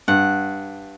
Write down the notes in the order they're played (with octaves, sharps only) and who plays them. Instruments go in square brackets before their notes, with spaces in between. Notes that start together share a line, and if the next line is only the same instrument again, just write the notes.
[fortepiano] G2 [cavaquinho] F#5